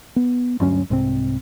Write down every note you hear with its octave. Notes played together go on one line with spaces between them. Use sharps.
B3
D2 G2 F#3 C#4
C2 G#2 C3 C4